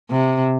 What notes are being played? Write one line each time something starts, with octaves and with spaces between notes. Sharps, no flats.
C3